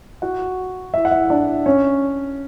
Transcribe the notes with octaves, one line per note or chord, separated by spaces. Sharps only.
F#4 F#5
E4 E5
F#5
E4 E5
D4 D5
C#4 C#5